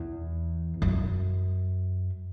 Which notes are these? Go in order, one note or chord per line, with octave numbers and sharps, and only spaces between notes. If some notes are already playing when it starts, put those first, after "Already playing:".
Already playing: E2
F#2